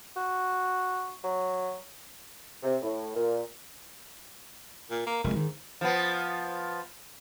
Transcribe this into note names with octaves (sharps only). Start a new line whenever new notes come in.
F#4
F#3
C3
A2
A#2
A#2
A#3
F1 F2 A#2 G#3
G#2 D#3
F3 B3